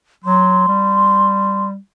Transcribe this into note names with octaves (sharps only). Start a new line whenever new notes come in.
F#3 C6
G3